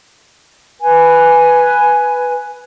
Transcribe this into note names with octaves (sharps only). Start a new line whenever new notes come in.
B4 G#5